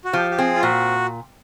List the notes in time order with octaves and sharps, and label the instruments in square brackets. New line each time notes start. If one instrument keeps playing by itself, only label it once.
[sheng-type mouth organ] F#4
[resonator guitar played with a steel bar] F3 [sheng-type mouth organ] G4
[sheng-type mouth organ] G4
[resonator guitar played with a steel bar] C4 [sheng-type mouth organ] G#4
[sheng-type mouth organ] F4
[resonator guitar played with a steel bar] A#2 [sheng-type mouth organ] F#4